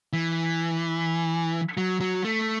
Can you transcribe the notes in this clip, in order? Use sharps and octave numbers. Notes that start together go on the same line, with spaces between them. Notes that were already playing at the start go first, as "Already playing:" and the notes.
E3
F#3
F#3
A3